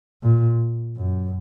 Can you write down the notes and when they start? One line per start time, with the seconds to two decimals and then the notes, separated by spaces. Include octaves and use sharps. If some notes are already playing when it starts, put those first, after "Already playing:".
0.23 A#2
0.97 F#2